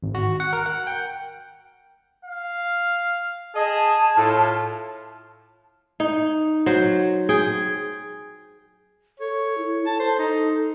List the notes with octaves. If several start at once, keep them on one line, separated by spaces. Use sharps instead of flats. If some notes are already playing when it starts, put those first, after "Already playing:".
G#1
F#4
F#5
A#4
F#5
G5
F5
G#4 D#5 A5
A2 F4
D#4
F#3 C5
G#4 G5
A4 C#5
E4
A4 A5
C5
D#4